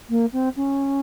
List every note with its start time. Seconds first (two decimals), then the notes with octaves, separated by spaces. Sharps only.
0.09 A#3
0.32 C4
0.56 C#4